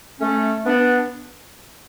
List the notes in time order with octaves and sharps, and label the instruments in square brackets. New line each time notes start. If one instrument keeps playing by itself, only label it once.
[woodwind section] A3 C#4
B3 D4